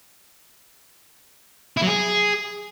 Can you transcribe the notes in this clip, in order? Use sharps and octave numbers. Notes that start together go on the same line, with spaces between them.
E4
F#3
G#4